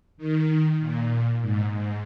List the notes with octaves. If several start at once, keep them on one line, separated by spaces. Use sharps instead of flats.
D#3
A#2
G#2
G#2